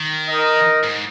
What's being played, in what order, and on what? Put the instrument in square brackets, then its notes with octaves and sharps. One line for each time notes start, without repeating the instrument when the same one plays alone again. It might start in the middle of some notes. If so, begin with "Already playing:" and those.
Already playing: [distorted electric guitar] D#3
[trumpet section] D#4 A#4 D#5
[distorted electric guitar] G#2